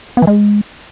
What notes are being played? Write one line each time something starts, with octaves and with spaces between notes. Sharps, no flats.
B3
E3
G#3